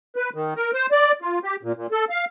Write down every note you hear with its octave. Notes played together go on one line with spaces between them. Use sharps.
B4
D#3
A#4
C5
D5
F4
G4
A#2
A#2
A4
F5